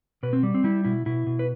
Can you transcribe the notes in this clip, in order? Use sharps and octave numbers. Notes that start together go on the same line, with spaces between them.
B2 B4
C4
G3
C4
G3 E4
B2 E4
B2 E4
B2
B4